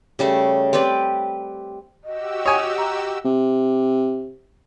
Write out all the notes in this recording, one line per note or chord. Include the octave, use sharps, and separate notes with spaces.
C#3 G3 A3
C4 G4 B4 D5
F#4 G4 D#5 E6
C#5 G#5 D#6
A#5
C3